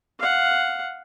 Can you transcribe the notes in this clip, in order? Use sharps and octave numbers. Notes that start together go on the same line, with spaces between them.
F5 F#5